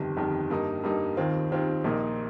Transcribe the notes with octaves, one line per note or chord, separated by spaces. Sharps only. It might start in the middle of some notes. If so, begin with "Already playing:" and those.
Already playing: G1 F2 D#3 G3
G1 F2 D#3 G3
G2 G3 A#3 D#4
G2 G3 A#3 D#4
D#2 D#3 C4 F4
D#2 D#3 C4 F4
A#1 A#2 A#3 D#4